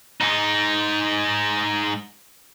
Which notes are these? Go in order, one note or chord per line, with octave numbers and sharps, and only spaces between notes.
G#2 D#4